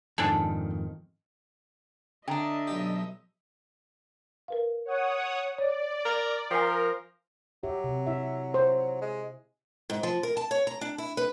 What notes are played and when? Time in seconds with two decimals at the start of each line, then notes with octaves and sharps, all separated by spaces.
0.18 F2 G#2 D#3 D4 G#4 A4
2.28 D3 D4 D#5 E5 G5 A#5
2.67 B1 G4
4.48 A#4 B4 F5
4.85 C#5 F#5 D#6
5.58 C#5 D5
6.05 A#4
6.51 F3 A#4 G5 G#5
7.63 F#3 G4 E5
7.84 C3
8.07 E4 E5
8.54 C5
9.02 G#3
9.90 G#2
10.03 F3
10.23 A#4
10.37 A5
10.51 C#5
10.67 A#5
10.81 D4
10.98 E4
11.17 B4